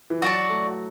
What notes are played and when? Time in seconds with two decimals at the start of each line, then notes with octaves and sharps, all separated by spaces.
0.10 E3
0.21 F#3 F#4 D5 A5
0.49 A3